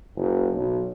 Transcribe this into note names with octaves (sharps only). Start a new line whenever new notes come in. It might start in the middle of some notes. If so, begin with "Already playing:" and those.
F#1
B1